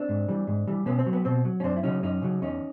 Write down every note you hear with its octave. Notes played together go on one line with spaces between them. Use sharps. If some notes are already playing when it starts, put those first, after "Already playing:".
Already playing: C4 D4
G#2
E3 G3
G#2
E3 G3
B2 B3 C#4
C4
F#3
B3
B2 C4
F#3
C#4
F#2 C4 D4
E4
C#3 F#3 C#4 D#4
F#2 C#4 D#4
C#3 F#3
E2 C#4 D#4